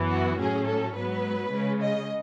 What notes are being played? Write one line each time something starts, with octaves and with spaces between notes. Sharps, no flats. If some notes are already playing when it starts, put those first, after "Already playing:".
Already playing: F#2 E3 B3
F#4
A2 F#3 C#4 G#4
A4
G#2 F#3 B3 B4
C#3 G#3 C#4
D#5